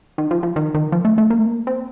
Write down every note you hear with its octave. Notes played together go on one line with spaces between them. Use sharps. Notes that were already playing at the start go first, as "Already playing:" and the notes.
D#3
F3
F3
D#3
D#3
F3
A3
A3
A#3
A3
A#3
C4